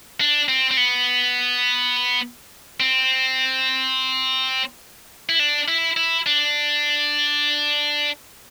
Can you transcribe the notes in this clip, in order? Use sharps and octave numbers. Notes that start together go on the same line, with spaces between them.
D4
C4
C4
B3
C4
E4
D4
E4
E4
D4